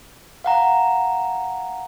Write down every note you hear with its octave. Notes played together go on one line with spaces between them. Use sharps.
F5 F#5 A#5